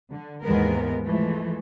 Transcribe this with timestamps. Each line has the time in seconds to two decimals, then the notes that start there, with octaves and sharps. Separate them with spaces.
0.12 D3
0.43 D#2 G#2 E3 G#3 B3 A#4
1.04 E3 F3 G#3 A3